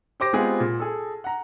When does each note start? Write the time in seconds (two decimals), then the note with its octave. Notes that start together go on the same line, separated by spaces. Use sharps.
0.20 G4 C5 D6 A#6
0.33 G#3 B3 C4 F4 G4 G#4
0.60 A#2
0.80 G#4 A4
1.24 F#5 A#5